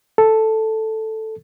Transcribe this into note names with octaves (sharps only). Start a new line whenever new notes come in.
A4